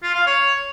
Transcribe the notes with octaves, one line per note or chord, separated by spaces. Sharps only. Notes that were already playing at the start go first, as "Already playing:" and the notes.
F4
F5
C#5